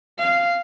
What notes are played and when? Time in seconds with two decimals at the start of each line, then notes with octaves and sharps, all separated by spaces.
0.18 F5